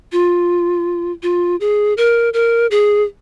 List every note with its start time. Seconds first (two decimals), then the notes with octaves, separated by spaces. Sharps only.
0.12 F4
1.23 F4
1.60 G#4
1.97 A#4
2.34 A#4
2.71 G#4